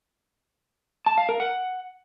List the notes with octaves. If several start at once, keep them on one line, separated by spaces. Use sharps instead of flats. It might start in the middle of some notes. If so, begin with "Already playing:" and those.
A5
F5
A#4
F#5